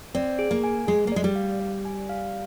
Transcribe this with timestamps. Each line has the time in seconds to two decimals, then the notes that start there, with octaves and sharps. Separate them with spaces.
0.15 C4 D5
0.39 G#4
0.51 A#3
0.64 G#5
0.87 G#3 G#4
1.07 A#3
1.12 G#3 D5
1.24 G3
1.35 F5
1.60 D5
1.85 G#5
2.09 F5